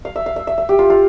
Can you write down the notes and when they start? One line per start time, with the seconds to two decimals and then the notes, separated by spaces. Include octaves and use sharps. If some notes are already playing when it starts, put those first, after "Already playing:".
0.05 F5
0.16 E5
0.26 F5
0.36 E5
0.47 E5
0.58 E5
0.69 G4
0.79 F4
0.90 F4